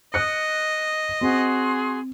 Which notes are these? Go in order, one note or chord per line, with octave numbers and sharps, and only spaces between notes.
D#5 D#6 F#6 C#7
C4 F#4 G#4 C6